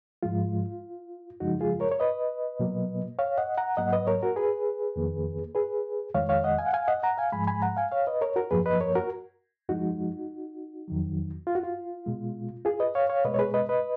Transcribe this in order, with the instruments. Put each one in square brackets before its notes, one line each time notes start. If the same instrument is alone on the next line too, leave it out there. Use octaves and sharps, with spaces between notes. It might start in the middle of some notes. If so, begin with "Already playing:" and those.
[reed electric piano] G#2 F3 G#3 F4
F#2 C#3 F3 G#3 D#4 F#4
F4 G#4
A#4 C#5
C#5
B4 D#5
B2 F#3 A#3
C#5 F5
D#5 F#5
F#5 A#5
G#2 F#3 A#3 D#5 F#5
B4 D#5
A#4 C#5
F#4 A#4
G#4 B4
F2 D#3 A#3
G#4 B4
F2 D#3 G#3 C#5 F5
C#5 F5
D#5 F#5
F5 G#5
F#5
F5 G#5
D#5 F#5
F#5 A#5
F5 G#5
G#2 F3 G#3 G#5 B5
G#5 B5
F#5 A#5
F5 G#5
C#5 F5
B4 D#5
A#4 C#5
F#4 A#4
F#2 F3 A#3 G#4 B4
B4 D#5
A#4 C#5
F#4 A#4
F#2 F3 G#3 D#4 F#4
F2 D#3 F#3
F4
F#4
F4
B2 G#3
F4 G#4
B4 D#5
C#5 F5
C#5 F5
B2 G#3 B4 D#5
C#5
G#4 B4
B4 D#5
B4 D#5